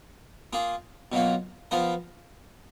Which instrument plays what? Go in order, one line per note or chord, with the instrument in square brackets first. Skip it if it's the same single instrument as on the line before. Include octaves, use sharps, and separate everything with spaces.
[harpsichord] A#3 F4 G#4
B2 F#3 A#3 F4
F3 B3 F4 A#4